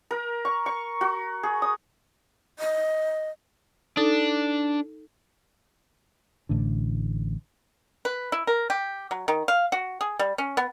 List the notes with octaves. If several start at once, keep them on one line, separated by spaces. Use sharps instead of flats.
A#4
C#6
C#6
F#4
G#4
D#6
D#5
D4 D#4 A4
A1 A2 D3
B4
E4
A#4
G4
F#3
D#3
F5
F#4
G#4
G3
C#4
B3